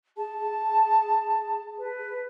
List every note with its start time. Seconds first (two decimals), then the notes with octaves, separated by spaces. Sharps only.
0.17 G#4 A5
1.78 B4